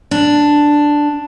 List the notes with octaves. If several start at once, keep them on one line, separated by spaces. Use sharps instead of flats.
D4